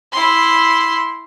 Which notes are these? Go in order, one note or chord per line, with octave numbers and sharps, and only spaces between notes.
E4 C6